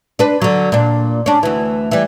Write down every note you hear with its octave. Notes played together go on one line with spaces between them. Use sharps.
D4 B4
D3 F#3
A#2 D4
C#4 D4
D2 E3
E3 G3